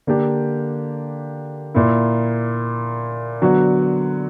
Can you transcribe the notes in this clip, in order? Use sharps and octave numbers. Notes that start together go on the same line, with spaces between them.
D3 A#3 D4 G4
A#2 A#3 E4
D3 F#3 B3 F#4